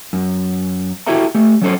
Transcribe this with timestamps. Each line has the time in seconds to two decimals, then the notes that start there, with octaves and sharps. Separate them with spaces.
0.13 F#2
1.06 E4 F#4 G4 A4 E5 A#5
1.35 A3 G4
1.62 F#3 C#4 A4 C5